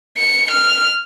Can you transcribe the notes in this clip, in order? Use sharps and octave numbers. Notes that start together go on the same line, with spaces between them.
C#7
F6